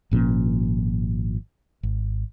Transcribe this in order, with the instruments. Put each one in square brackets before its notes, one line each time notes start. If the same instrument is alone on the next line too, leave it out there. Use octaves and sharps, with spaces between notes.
[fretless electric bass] G#1 A#2 F3 C#4
G#1